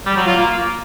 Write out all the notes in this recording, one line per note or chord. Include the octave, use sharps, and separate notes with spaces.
G3
F#3
F4
A#3